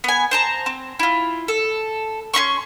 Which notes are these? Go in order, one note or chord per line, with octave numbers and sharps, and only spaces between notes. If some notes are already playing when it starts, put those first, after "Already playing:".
B3 G#5
C5 A5 A#5
C4
E4 F4
A4
C#4 D#4 C6 C#6